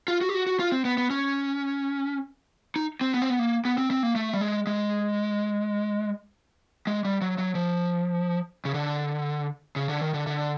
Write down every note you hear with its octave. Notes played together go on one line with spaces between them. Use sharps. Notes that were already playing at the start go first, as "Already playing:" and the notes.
F4
F#4
G4
F#4
F#4
F4
C4
B3
B3
C#4
D#4
C4
B3
C4
B3
A#3
B3
C4
C4
A#3
A3
G3
G#3
G#3
G#3
G3
F#3
F#3
F3
C#3
D3
C#3
D3
D#3
D3
D3